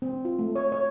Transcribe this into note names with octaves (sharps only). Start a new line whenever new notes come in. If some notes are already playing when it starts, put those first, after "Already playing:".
C4
F4
A3
C#5
C#5